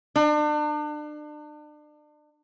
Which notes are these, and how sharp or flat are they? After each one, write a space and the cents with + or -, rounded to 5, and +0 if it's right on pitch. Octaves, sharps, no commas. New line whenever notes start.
D4 +35